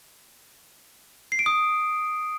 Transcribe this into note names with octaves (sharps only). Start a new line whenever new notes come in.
C7
D7
D#6